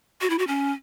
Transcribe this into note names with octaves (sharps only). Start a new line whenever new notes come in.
F#4
E4
F#4
C#4